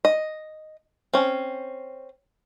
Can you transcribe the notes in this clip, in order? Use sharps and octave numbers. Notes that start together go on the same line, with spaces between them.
D#5
C4 C#4